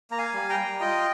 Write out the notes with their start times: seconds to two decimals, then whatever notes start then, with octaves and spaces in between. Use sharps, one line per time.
0.11 A#3 A#5
0.18 F5 G#5
0.34 G3
0.49 G5 A#5
0.57 G3
0.80 F4 D#5 G5